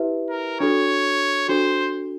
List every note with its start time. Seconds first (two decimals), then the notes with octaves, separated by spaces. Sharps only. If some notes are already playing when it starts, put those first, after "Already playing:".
Already playing: E4 G4 B4 E5
0.30 A#4
0.60 D4 F#4 A4 C#5
1.48 D4 F#4 A4 C5